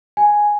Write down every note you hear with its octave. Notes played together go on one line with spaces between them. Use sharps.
G#5